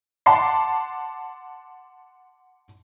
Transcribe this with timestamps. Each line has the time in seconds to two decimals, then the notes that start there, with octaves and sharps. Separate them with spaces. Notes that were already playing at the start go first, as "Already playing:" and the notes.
0.26 F#5 A5 C6 D6 C7